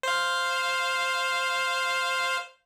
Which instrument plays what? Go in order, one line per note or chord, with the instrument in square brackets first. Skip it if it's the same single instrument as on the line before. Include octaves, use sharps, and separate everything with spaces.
[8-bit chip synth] C5 F5